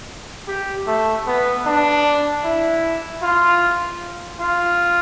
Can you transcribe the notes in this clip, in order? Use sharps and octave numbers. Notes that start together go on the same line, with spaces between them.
G4
A3
B3
D4
E4
F4
F4